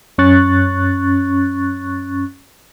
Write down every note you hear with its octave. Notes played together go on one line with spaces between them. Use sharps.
F#2 C#4 C#6 F#6 A6